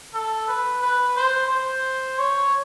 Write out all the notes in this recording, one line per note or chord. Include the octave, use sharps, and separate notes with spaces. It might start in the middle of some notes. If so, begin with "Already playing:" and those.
A4
B4
B4
C5
C5
C#5